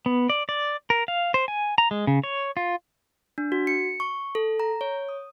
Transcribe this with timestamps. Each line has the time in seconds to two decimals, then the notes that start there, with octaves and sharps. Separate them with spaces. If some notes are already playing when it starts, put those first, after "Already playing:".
0.06 B3
0.30 D5
0.49 D5
0.90 A#4
1.08 F5
1.34 C5
1.48 G#5
1.78 A#5
1.91 G#3
2.07 C#3
2.24 C#5
2.57 F4
3.38 D4
3.52 F#4
3.67 C#7
4.00 C#6
4.35 A4
4.60 A#5
4.81 C#5
5.09 D#6